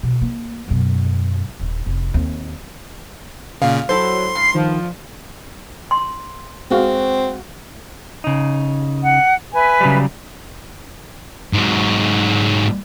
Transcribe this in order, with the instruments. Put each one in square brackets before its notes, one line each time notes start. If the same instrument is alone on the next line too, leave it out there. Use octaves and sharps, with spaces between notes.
[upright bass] D2 B2
A#3
F#2 B2
D#1
F1
D#2 C4
[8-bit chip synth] A#2 C#3 [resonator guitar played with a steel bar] F5
[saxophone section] F#3 [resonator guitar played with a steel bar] E4 A4 C5 [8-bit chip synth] C6
[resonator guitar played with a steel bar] G2 [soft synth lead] C7
[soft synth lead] D#3 [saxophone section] F3
[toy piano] C6
[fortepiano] G#3 F#4 F5 [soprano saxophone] C4
[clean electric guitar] C#3 D#4
[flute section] F#5
B4 E5 G#5
[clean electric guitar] C#3 F#3 G3
[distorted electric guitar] G#2 F#3